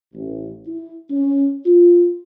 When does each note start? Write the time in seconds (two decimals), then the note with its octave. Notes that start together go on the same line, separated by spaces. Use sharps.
0.14 A1
0.67 E4
1.10 C#4
1.66 F4